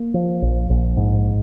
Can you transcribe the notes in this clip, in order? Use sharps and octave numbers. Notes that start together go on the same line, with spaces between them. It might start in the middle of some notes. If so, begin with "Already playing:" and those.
Already playing: A#3
F3
A#1
A#1
G#2